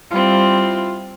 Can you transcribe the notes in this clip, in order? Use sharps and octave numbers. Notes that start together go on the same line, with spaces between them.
G3 C4 E4 F4